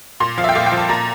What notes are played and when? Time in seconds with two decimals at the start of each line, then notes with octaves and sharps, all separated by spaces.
0.20 A#2 C6
0.38 F3 F5
0.44 E5 G5
0.55 A#2 F5
0.66 G5
0.72 F3
0.77 A5
0.89 A#2 A#5